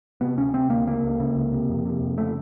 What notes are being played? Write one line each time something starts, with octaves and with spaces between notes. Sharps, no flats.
C3 B3
D2 C#4
C3 C4
D2 A#3
C#3 A#3
C#2
C#3
C#2
C3
F2
C3
F2
C#3 A3